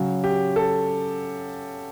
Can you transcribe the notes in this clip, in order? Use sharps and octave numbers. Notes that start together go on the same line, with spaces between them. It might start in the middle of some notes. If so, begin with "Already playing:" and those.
Already playing: C#3 F#3
G4
A4